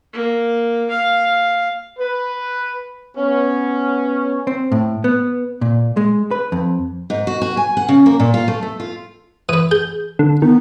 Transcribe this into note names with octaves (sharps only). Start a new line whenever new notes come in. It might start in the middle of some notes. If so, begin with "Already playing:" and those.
A#3
F5
B4
B3 C#4
C4
A2
B3
A#2
G#3
B4
F2
G#2
F#4
F#4
G#5
F#5
C#3
A#3
A#2
F4
A3
A3
F4
E3 B4 D#6
G#4 G6
D3
D#3 B3